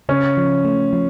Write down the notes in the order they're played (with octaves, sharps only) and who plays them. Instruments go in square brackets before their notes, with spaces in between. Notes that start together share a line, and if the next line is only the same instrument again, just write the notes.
[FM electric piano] C#3 [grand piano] C#4
[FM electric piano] F3
A3
F3